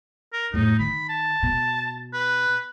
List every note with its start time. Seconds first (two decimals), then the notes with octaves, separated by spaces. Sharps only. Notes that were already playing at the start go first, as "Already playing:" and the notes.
0.33 A#4
0.54 F2 A2 D#4
0.79 D#3 B5
1.09 A5
1.43 B2
2.13 B4